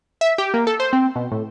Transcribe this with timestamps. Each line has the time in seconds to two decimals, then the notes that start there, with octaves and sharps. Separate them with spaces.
0.21 E5
0.38 G4
0.54 A#3
0.67 A4
0.80 C5
0.93 C4
1.16 B2
1.32 A2